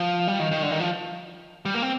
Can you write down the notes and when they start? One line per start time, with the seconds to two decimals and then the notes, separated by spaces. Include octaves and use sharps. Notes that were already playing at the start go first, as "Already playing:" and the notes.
Already playing: F3
0.28 G3
0.40 D#3
0.51 D#3
0.62 D3
0.71 D#3
0.80 F3
1.66 G3
1.74 A#3
1.82 C4